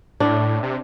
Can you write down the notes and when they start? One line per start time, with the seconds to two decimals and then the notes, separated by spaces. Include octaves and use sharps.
0.20 A2 D4
0.63 C3